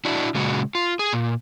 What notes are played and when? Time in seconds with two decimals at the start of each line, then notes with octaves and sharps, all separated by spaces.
0.05 D4 E4 F#4
0.35 A#2 C#3 G#3 F#4
0.75 F4
0.99 G#4
1.13 A#2